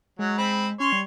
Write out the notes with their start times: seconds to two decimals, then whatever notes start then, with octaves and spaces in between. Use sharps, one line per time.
0.19 F#3 G#3
0.38 C4 B5
0.80 C#4 C#5 C6
0.92 G3